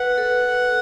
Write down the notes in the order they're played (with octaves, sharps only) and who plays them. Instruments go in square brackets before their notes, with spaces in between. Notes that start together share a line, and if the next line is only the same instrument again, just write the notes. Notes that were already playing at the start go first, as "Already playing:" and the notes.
Already playing: [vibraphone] B4 [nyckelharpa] F#5
[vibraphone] A4